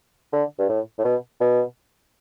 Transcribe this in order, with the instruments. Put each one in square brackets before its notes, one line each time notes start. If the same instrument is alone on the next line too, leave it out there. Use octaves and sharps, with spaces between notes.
[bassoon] D3
G2
A2
A2
B2
B2